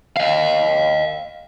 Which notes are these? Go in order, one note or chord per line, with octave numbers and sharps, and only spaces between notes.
D#5 F5